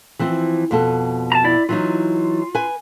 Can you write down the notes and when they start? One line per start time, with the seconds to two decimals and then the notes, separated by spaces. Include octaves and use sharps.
0.19 E3 F3 C4
0.71 F2 B2 A4
1.32 A5 A#5
1.44 E4 D5
1.69 E3 F#3 D#4 F4
2.55 B4 G#5